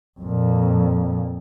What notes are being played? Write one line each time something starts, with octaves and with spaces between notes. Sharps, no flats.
F2 A#2